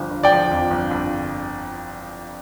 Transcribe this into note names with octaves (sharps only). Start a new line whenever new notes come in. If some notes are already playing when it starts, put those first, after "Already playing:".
Already playing: G1 F3
G1
D5 G5
F3
F2
G1
G1